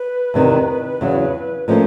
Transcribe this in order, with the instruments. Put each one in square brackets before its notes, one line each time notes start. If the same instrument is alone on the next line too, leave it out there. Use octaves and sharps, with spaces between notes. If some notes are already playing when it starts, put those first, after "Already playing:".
Already playing: [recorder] B4
[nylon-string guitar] E2 C3 D#3
E2 C#3 F#3
[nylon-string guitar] A#2 F3 A3 C#4 [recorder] C5